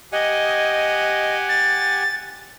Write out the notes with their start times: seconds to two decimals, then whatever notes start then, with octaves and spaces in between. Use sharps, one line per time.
0.12 G4 D#5 F#5 G#5
1.49 A6